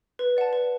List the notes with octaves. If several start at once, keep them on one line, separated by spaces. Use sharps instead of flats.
B4
D5 F#5 A5
B4